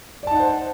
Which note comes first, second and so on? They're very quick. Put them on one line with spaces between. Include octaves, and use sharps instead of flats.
D5 A5 D#4 F#5 C5